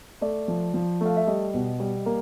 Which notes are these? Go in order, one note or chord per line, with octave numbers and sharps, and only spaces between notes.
A3 D5
F3
F3
A3 F5
E5
G3 D#5
B2
G3
A#3